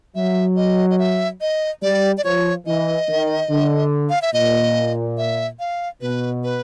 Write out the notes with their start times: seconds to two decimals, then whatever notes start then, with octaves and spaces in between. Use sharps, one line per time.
0.15 F#3 E5
0.56 D#5
0.90 D#5
0.99 E5
1.41 D#5
1.82 G3 D5
2.17 D5
2.24 F3 C#5
2.66 E3 D#5
3.08 D#3
3.50 D3
4.09 F5
4.22 E5
4.33 A#2 D#5
5.18 E5
5.59 F5
6.01 B2 B4
6.44 B4